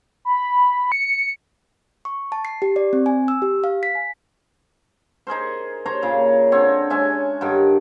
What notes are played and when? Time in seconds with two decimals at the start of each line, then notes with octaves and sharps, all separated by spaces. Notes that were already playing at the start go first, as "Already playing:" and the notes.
0.25 B5
0.92 C#7
2.05 C#6
2.32 A5
2.45 C7
2.62 G4
2.76 D5
2.93 C4
3.06 G#5
3.28 E6
3.42 G4
3.64 F5
3.83 B6
3.95 G#5
5.27 D#4 G#4 A#4 C5
5.86 C5 C#5 A#5
6.03 A#2 C#3
6.52 D3 C4 C#5
6.90 G#3 C#4 E5 G#5
7.41 G2 D3 D#3